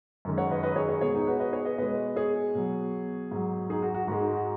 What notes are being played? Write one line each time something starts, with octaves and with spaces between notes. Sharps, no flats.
F#2 D#3 G#3
C#5 F#5
B4 D#5
B4 D#5
G#4 C#5
G#4 C#5
B2 G#3 G#4 C#5
D#4 G#4
F#4 B4
B4 D#5
G#4 C#5
B4 D#5
B2 G#3 B4 D#5
G#4 C#5
B2 F#3
G#2 F#3
D#4 G#4
F#4
F#4
G#2 G#3 F#4
D#4
F#4